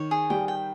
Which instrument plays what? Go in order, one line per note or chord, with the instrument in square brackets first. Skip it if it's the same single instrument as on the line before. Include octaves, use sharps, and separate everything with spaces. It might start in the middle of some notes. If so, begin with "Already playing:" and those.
Already playing: [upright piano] D#3 [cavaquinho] C#5
[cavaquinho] G#4
[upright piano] G3 [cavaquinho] G5
[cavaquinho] G5